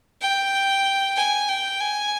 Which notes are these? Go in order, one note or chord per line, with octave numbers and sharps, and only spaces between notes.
G5
G#5
G5
G#5